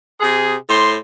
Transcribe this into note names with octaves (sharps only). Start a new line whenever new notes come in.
C3 G#4
A2 C5 C6